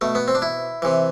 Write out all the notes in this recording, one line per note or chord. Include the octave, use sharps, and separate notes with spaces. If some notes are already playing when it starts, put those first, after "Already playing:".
B2 A3
B3
C4
D4
E4
C3 E3